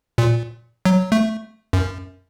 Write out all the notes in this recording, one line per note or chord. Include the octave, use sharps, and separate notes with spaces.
A#2
F#3
A3
F#2